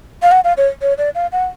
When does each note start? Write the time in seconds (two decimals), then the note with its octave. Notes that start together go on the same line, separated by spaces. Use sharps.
0.23 F5
0.32 F#5
0.44 F5
0.57 C#5
0.82 C#5
0.98 D5
1.15 F5
1.32 F#5